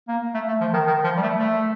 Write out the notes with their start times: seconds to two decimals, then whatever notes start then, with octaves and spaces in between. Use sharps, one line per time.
0.08 A#3
0.34 A3
0.48 A3
0.61 F3
0.73 D#3
0.87 D#3
1.04 F3
1.17 G3
1.22 A3
1.39 A3